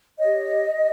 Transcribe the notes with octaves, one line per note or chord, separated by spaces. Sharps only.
G4 C#5 D#5
G4